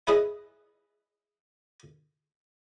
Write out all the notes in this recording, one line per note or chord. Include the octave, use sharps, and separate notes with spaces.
E4 G#4 B4 D#5